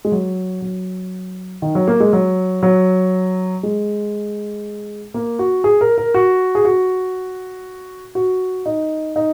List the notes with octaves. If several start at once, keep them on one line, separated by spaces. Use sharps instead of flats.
G#3
F#3
F#3
D#3
F#3
A#3
G#3
F#3
F#3
G#3
A#3
F#4
G#4
A#4
A#4
F#4
G#4
F#4
F#4
D#4
D#4